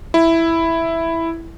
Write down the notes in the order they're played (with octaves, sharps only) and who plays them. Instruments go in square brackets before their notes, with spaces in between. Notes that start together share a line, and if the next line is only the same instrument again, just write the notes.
[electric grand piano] E4